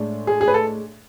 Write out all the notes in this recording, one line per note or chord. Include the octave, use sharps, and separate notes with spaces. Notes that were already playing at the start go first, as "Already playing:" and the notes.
Already playing: A2 G#3 D4
G#4
G#4
B4
A4